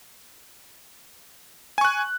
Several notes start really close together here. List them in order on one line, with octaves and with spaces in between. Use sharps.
G#5 C#6 F#6